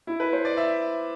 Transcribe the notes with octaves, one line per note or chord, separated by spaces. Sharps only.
E4
B4
C5
D5
E5